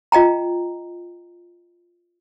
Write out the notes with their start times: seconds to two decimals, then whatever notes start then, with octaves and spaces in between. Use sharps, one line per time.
0.12 F4 D#5 G5 A#5